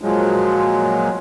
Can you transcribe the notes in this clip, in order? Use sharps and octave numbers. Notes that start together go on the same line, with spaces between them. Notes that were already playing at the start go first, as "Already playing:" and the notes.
A#2 F3 F#3 G#3